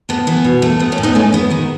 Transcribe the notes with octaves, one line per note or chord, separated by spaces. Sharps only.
A2 B3
E3 B3
B2
A3
A2 B3
A3 C#4
A2
B3 D#4
G#3 A3 C#4
G#3 B3
D#3 B3